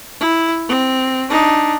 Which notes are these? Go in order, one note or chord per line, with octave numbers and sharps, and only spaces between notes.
E4
C4
D4 D#4